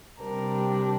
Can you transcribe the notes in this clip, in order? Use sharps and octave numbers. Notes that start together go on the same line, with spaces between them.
C3 G3 D4 A#4